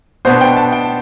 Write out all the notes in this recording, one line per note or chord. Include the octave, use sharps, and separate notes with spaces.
B2 B3 D4 C5
G5
A5
G5